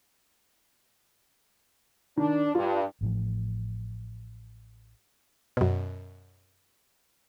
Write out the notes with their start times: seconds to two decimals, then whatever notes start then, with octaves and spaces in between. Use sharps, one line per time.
2.17 D#3 D4
2.55 G2 F4
3.01 A1 A2 F3
5.57 F#2 B2